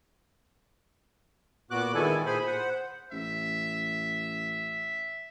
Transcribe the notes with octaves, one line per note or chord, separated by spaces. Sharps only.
A#2 B3 F#4 D6 F#6
D#3 G#3 B3 E4 A4 G#5
A#2 G#4 C5 G#5 B5
C5 F#5
A1 E5